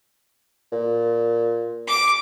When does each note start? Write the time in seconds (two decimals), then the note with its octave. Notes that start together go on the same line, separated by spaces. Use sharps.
0.73 A#2
1.87 D6